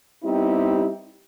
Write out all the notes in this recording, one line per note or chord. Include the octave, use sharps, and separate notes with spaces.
G3 B3 C4 D#4 E4 G4